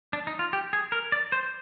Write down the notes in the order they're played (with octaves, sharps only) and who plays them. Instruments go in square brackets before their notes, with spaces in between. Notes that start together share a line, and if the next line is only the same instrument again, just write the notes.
[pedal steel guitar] D4
D#4
F4
G4
G#4
A#4
D5
C5